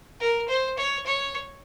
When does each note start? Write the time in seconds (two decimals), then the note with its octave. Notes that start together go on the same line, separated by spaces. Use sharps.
0.20 A#4
0.48 C5
0.78 C#5
1.06 C#5